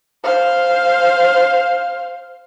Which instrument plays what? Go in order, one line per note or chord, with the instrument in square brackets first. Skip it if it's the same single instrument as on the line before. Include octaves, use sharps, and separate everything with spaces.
[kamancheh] C5 F5